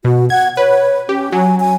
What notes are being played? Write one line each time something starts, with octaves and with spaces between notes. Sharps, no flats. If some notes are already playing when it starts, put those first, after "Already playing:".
B2 F#4
F#5 G#6
B4 C#5
C#4 G4
F#3 G#5
G#5